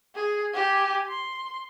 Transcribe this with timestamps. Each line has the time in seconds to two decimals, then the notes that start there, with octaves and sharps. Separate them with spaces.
0.15 G#4
0.54 G4 G#5
1.08 C6